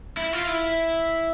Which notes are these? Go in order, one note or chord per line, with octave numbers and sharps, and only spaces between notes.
E4
F4
E4